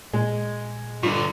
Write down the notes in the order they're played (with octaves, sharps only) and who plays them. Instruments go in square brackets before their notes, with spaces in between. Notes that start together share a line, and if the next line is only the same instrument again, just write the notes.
[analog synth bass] A#2 [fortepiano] G#3
[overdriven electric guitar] G2 D3 [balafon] D4 F4